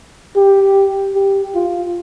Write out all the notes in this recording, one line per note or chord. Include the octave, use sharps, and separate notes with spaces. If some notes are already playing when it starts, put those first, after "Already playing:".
G4
G4
F4